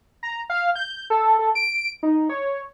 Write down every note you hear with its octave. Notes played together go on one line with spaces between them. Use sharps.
A#5
F5
G6
A4
A4
D7
D#4
C#5